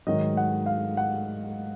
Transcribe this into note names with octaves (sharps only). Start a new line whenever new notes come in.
G#2 D#3 F#3 D#5
F#5
F5
F#5